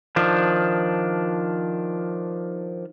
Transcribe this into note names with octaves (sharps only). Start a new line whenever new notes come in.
D#3 F3 D4